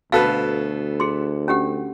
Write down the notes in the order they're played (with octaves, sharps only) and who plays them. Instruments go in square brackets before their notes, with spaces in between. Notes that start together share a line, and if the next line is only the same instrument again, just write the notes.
[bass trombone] D2 [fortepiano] B2 A4 B4 [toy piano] F5
[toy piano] G#4 C6
C#4 G4 F#5